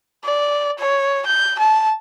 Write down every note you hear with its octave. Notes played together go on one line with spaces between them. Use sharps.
D5
C#5
G6
A5